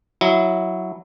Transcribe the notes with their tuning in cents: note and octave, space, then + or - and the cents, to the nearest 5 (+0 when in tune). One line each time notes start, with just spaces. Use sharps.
F#3 +0 E4 +0 E5 -45